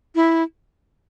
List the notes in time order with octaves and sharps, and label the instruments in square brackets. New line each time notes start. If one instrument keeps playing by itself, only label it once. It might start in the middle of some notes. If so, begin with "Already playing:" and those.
[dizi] E4